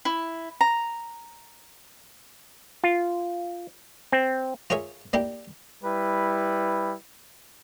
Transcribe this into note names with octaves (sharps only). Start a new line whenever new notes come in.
E4
A#5
F4
C4
F4 G#4 A#4 C#5 E5
A#3 D4 E4 G4
G3 E4 B4